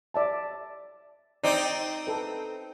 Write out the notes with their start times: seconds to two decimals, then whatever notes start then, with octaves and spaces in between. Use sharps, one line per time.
0.14 D5 E5 A5
1.44 C4 D#4 D5
2.07 A4 B4